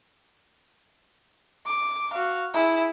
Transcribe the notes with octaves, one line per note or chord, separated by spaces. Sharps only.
D6
F#4 F5
E4 G#4